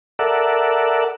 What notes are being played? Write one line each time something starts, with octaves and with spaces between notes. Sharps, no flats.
A4 A#4 D5 E5 F#5